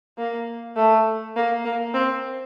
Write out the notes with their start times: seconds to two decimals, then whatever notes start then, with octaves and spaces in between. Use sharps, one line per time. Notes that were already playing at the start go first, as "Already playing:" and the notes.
0.18 A#3
0.76 A3
1.36 A#3
1.65 A#3
1.94 C4